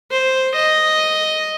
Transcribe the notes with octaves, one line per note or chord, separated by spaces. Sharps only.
C5
D#5